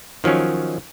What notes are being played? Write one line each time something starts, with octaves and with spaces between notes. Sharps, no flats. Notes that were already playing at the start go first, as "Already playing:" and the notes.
D#3 F3 F#3 C#4